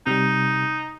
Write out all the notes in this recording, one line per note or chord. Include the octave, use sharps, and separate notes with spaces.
C3 G3 D#4